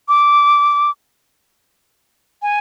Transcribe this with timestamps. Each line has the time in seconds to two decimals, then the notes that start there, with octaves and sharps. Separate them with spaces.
0.08 D6
2.42 G#5